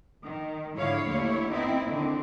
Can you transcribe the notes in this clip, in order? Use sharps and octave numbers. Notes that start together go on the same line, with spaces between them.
D#3
G#2 D3 F3 E4 C#5 F5
D#2 D3 A3 E4 C#5
C4 D#4 E4
D3 D#3 C4